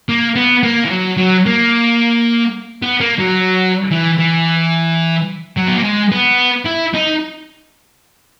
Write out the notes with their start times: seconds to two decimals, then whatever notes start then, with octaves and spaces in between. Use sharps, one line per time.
0.09 A#3
0.36 B3
0.63 A#3
0.85 E3
0.90 F#3
1.17 F#3
1.46 A#3
2.82 B3
3.01 A#3
3.19 F#3
3.91 E3
4.19 E3
5.57 F#3
5.68 B3
5.76 A#3
5.83 G#3
6.12 B3
6.66 E4
6.94 D#4